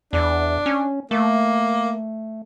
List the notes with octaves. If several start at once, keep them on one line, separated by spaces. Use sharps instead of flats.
E2 D4
C#4
A3 A#3